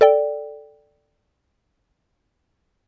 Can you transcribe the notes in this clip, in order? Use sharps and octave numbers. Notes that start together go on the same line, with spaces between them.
A4 D5 G5